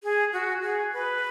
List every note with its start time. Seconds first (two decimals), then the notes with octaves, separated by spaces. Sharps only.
0.04 G#4
0.33 F#4
0.63 G#4
0.93 B4